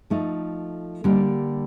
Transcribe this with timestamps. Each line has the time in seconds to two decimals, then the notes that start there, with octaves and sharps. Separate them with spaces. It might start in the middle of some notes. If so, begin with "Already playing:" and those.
0.10 F3 A3 D#4 A4
1.04 D3 G3 A#3 D4